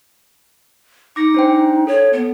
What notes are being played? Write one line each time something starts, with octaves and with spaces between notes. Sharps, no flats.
D#4 D6 A#6 C#7
D4 C5 G5
A4 C#5
B3